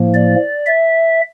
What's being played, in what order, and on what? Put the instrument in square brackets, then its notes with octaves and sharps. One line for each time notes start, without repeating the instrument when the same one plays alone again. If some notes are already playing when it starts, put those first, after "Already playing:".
Already playing: [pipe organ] A2 F3 A#3
D5
E5